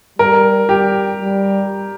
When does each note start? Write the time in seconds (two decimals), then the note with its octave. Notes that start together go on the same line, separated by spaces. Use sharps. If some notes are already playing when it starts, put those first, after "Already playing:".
0.19 G3 A#4
0.69 G3 G4
1.20 G3